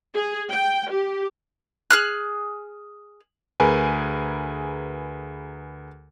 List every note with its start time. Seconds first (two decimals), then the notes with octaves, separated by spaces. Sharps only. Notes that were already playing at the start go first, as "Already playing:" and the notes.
0.15 G#4
0.50 G5
0.90 G4
1.90 G#4 F6 F#6
3.60 D2 G#4 A#4 B4 G#5